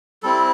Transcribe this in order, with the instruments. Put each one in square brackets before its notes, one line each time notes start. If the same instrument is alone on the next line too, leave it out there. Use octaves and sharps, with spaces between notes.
[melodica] G3 C4 E4 A4